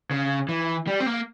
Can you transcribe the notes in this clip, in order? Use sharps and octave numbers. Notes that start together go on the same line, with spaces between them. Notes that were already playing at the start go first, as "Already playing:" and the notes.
C#3
E3
G3
C4
A#3